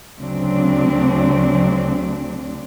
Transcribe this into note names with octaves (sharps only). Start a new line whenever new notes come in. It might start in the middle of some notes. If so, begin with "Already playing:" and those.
D2 C#3 F#3 C4 D4